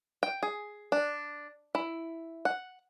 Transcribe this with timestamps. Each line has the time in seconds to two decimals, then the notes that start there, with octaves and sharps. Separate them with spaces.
0.23 G5
0.43 G#4
0.92 D4
1.75 E4
2.45 F#5